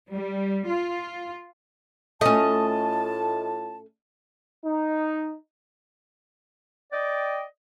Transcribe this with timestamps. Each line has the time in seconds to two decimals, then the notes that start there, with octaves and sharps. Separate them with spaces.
0.11 G3
0.67 F4
2.21 A2 A3 C#4 F4 D#5 A5
4.65 D#4
6.92 D5 D#5 G5